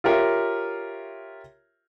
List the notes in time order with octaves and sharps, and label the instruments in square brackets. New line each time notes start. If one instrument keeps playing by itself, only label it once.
[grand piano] F4 G4 A#4 C#5 E5 F5